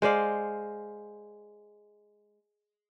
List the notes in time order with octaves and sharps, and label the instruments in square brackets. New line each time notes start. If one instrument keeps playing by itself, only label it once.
[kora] G#3 C5 D5 F5